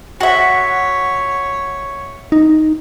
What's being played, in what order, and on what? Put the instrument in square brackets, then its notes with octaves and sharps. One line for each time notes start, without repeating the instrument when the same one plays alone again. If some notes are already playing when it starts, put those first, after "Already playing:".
[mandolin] F#4 E5 [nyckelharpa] C#5
[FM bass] D#4